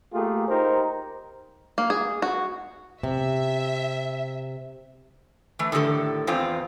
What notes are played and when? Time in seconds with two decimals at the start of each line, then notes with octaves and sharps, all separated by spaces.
0.13 A3 A#3 F4 G4 G#4
0.48 D#4 G4 A#4 C5
1.78 A#3
1.90 G#4
2.22 F#4
3.03 C3 E5
5.59 E3 A3
5.72 A2 D3 D#3 G4 A4
6.27 E2 C4 F4